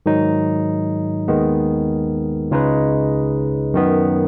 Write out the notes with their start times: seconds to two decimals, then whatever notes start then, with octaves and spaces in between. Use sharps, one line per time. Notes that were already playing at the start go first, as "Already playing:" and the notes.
0.06 G#2 D#3 F#3 D#4
1.28 D#2 D#3 G#3 B3
2.51 C#2 C#3 G#3 D#4 B4
3.74 F#2 D#3 B3